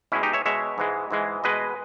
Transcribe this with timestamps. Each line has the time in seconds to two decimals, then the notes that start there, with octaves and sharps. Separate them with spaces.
0.12 B2 G#3 C#4 E4
0.23 D#4 G4
0.33 C#5 E5
0.46 B2 G#3 C#5 E5
0.78 G#2 E3 G#3
1.11 G#2 E3 G#3
1.44 B2 G#3 B4 D#5